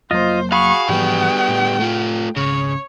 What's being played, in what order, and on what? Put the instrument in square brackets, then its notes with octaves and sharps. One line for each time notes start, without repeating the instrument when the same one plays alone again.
[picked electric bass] F1 F#3 A#3 [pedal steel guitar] F4 D#5 [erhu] C5
[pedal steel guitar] F#4 G#4 B5 [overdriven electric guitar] F5 [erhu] C#6
[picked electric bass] G#2 E3 F3 [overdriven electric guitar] G3 B3 [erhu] G5
[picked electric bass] A2
[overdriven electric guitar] A3 F4
[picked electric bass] G#1 C#2 [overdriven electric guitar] C#3 [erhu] C#5